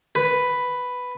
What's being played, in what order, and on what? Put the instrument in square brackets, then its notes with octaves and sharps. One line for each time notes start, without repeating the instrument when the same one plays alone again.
[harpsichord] B4